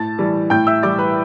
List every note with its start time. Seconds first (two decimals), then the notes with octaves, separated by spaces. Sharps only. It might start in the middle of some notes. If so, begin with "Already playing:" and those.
Already playing: A2 A5 A6
0.18 E3 G3
0.50 A2 G5 G6
0.67 E5 E6
0.83 E3 G3 D5 D6
0.98 B4 B5